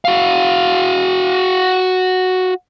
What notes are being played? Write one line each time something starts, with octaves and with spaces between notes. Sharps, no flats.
F#4 F5